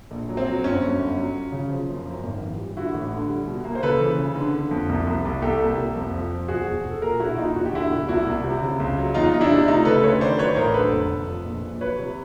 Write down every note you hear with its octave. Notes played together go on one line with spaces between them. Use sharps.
A#1
F#3
C4
F#3
G1 C#4
G1
G1
F#3
F#3
C#3
F3
F#2
F#2
G#1
E3
G3
D3 E4 F#4
A1
D3
G3
B2
A#3
C5
C#3 A4 B4
E3
C#3
D3
D3
F2
C2
C2
C2
C2 G4 A4
A#3
C2
F2
F3
F3
E1 F#4 G#4
E1
E1
A4
A#2 G#4 A#4
A#1 E4 F#4
A#1 D#4 F4
E1 F#4
G4
D3 E4 F#4
E1
C2 E4 F#4
C2
C3
C#3
C#2
F#3
E2 D#4 F4
E2 D#4
D4 E4
C3
A3 D#4 F4
C#3 A4 B4
D2 B4 C#5
D#3 C5 D5
F#3 B4 C#5
C#5
A1 A#4 C5
D3 A4 B4
F1
F1
F3
A#1
A#1
F#3 B4 C#5
C3